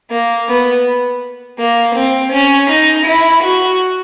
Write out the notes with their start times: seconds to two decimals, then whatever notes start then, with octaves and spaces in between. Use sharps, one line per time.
0.11 A#3
0.49 B3
1.59 A#3
1.95 C4
2.32 C#4
2.70 D#4
3.06 E4
3.43 F#4